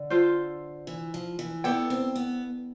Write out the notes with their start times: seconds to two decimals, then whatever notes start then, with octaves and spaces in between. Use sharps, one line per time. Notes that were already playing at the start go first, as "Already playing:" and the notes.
Already playing: D3
0.10 F4 A4 C5
0.87 E3
1.14 F3
1.39 E3
1.64 B3 E4 A4 D5 G5
1.90 C4
2.16 B3